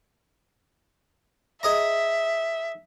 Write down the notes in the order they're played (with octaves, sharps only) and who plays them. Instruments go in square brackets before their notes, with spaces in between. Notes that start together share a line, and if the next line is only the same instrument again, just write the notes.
[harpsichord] G#4 D#5 A#5 [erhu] E5